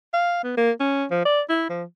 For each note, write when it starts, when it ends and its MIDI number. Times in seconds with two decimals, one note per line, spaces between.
0.14 0.39 77
0.43 0.57 59
0.57 0.71 58
0.80 1.05 61
1.11 1.24 53
1.25 1.41 74
1.49 1.65 64
1.69 1.84 53